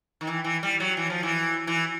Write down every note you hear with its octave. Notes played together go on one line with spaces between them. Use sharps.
D#3
E3
E3
G3
F#3
E3
F3
E3
E3